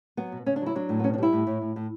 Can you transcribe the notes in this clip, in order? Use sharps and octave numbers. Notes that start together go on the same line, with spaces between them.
F#3 B3
B2
C#3 C#4
D4
F#3 E4
F#3 D4
A2
B3
B2 C#4
D4
G3 E4
A2
A2
A2
A2